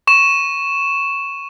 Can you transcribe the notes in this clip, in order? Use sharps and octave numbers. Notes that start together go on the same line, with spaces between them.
C#6 E7